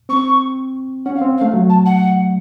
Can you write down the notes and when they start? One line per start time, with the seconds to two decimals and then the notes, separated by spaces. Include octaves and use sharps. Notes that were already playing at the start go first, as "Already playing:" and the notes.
0.09 C4 C#6
1.05 C#4 F#5
1.15 F5
1.22 C4
1.37 F5
1.41 A3
1.54 F#3
1.69 A5
1.85 F#5